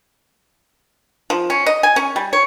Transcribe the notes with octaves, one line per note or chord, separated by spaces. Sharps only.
F3
C#4
D#5
G#5
C#4
G3
C#5